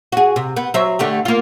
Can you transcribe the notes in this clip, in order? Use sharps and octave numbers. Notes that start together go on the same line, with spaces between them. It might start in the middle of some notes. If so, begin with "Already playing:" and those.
F#4 G#4
C3
B3
F#3 C5 E5
D3 A3 G4
A#3 F4